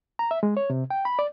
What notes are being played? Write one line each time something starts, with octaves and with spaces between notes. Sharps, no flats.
A#5
E5
G#3
C#5
C3
G5
B5
D5